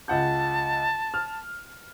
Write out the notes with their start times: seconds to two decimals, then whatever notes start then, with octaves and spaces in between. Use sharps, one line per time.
0.08 C#2 F#5 A5 G6
1.14 F6